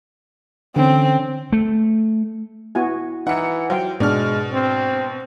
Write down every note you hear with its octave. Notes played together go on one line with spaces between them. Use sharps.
D3 E3 C4 C#4
A3
B3 E4 F#4 G#5
E3 D#4 F#5 C#7
F#3 C5 F5 G5
G#2 B2 G#3 D4 F6
C4